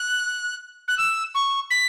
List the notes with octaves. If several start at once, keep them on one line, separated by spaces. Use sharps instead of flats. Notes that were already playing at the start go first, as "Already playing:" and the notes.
Already playing: F#6
F#6
E6
C#6
B6